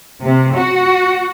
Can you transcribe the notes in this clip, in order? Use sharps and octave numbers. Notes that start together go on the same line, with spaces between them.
C3
F#4